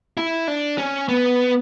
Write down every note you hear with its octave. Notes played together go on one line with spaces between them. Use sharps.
E4
D4
C#4
B3